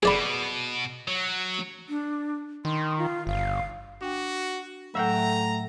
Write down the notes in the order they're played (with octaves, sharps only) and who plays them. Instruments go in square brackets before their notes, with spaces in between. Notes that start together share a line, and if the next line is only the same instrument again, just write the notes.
[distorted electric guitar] B2 [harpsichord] G#4 D5 B5
[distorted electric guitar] F#3
[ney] D4
[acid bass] D#3 [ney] C6
[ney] F4
[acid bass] G1 [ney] F5
[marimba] D4 G5 [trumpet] F#4
[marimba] A2 F#3 [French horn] A3 [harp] E5 F#5 G5 [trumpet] A#5